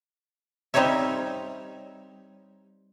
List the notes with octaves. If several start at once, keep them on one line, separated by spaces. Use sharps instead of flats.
G3 C4 D#4 G4 C#5 E5